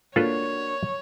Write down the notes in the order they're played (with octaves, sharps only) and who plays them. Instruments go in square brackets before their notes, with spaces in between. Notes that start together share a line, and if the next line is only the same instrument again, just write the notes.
[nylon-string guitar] A#3 D4 F#4 [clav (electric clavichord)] F4 A4 B4 [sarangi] C#5